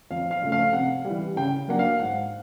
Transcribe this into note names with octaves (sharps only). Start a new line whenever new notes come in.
F2 F5
F5
C#3 F3 A3
F5
C3 F#5
E3 G3
C#3 G5
F#3 A#3 D4 F#5
F5
G#2 F#5